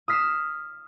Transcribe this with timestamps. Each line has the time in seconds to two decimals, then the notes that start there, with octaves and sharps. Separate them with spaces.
0.08 D#6 F6 B6 C7 D#7 E7